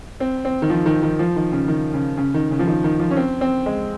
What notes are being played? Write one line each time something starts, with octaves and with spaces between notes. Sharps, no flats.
C4
C4
D#3
F3
D#3
D#3
F3
D#3
C#3
D#3
C#3
C#3
D#3
C#3
F3
D#3
D#3
F3
C#4
C4
C4
G#3